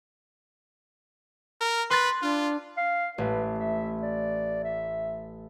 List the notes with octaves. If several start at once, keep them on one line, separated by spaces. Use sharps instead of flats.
A#4
B4 C6 F#6 A6
D4 F4
F5
A1 B4
E5
D5
E5